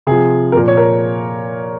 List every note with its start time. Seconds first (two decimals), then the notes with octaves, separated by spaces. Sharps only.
0.07 C3 F3 G#4
0.52 A#2 F3 A#4
0.68 C#5
0.77 A#4